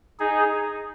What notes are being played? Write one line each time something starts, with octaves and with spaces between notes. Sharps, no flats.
D#4 G#4